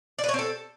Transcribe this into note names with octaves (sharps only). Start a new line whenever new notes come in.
D5
B4
C#5
C4
A4